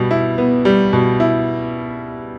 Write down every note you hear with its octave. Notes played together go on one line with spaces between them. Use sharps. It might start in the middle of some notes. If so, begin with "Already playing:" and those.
Already playing: B2 G3
E4
B3
G3
B2
E4